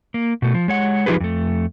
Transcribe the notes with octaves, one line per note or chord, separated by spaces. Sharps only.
A#3
B2 A3
F3
G#3 C#5 F#5
F3 D#4 F4 G4 G#4 B4
F2 A3